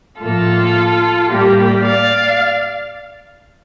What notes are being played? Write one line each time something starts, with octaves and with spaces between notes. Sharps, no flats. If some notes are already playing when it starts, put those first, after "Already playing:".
A2 F3 A#3 F4 A4
A2 G3 A#3 G4
D5 F5